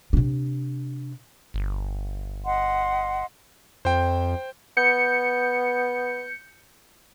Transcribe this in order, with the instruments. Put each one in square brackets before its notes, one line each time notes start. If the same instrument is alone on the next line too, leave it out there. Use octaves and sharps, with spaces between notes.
[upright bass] C3 D4
[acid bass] G1
[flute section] D#5 F#5 C6
[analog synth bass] F2 [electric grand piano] C5 G5
[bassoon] B3 [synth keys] G6 C#7